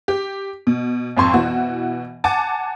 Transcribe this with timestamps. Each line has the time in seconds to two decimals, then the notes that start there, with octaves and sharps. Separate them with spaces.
0.08 G4
0.67 B2
1.17 G#1 F2 C6 C#6
1.34 B2 E3 F#4
2.24 F#5 G#5 A5 D6 A6